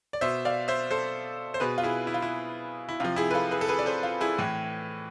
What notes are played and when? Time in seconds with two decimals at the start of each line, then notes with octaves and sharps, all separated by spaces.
0.13 D5
0.21 B2 C5 E5
0.45 D5 F5
0.68 C5 E5
0.91 A4 C5
1.54 C5
1.60 B2 G#4 B4
1.78 F4
1.83 E4 G#4
2.07 E4
2.14 F4
2.22 E4
2.89 E4
3.00 C3 F3 F4
3.16 E4 G#4
3.31 B4
3.34 F4 A4
3.51 G#4 B4
3.61 A4
3.68 G#4 B4
3.78 D5
3.86 A4 C5
4.03 F4
4.21 E4 G#4
4.38 A2 E3